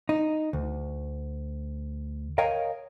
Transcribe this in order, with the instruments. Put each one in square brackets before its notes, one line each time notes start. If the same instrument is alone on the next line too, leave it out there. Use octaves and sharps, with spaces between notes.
[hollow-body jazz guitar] D#4
D2
A#4 C#5 D#5 F5 G5